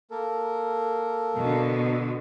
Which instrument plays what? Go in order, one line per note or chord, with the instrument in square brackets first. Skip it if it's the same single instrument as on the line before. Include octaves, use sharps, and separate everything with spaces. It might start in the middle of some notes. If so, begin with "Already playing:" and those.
[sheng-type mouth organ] A#3 A4 A#4
[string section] B2 D3